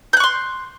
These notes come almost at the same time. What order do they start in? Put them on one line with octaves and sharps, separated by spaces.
G6 F#6 C#6 C6